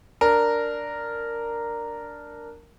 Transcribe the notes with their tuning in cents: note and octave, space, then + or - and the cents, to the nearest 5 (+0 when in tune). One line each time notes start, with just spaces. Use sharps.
D4 +0 A#4 -5